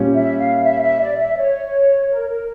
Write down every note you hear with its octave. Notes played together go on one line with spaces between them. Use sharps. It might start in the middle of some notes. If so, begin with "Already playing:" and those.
Already playing: A#2 G3 C#4
E5
F5
E5
E5
D5
E5
C#5
A#4
A#4